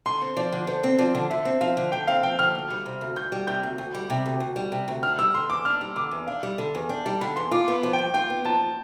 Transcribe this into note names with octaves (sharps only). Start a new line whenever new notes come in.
D3 C6
C4
F3 D5
D3
D3 C5
C4
F3 D5
D3
D3 E5
C4
F3 F5
D3
D3 G5
C4 F5
F3 G5
D3 F6
D2
G3
C3
D2
D2 G6
G3
C3 G6
D2
D2
G3
C3
D2
D2
G3
C3
D2
D4 F6
G3 E6
D3 C6
E2 D6
D4 F6
G3
D3 D6
E2
D4 F5
G3
D3
E2
D4 G5
G3 A5
D3 B5
E2 C6
F4 D6
B3 D6
F3
G5
G2
F4 G5
B3
F3 A5